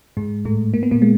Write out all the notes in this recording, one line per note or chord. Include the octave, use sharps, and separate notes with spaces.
G#2 G#3
A2 A3
A#3
B3
A#2 A#3
G#3